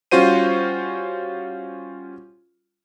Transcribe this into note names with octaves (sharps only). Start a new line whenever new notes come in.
G3 C#4 F4 F#4 C5 D#7